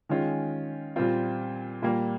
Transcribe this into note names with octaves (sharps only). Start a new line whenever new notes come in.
D#3 G#3 C#4 F4
A#2 G3 C4 F4
A#2 G3 A#3